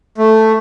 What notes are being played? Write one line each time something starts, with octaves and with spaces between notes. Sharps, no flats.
A3